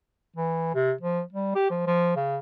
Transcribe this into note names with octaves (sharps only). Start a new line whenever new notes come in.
E3
C3
F3
G3
G4
F3
F3
C#3